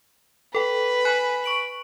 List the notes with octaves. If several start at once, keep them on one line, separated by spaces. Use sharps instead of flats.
A4 B4 G5
G#5 B5 F#6
C#6 D7 F#7